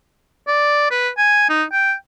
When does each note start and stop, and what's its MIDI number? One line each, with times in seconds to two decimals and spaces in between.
0.48 0.91 74
0.91 1.09 71
1.18 1.45 80
1.50 1.63 63
1.72 1.94 79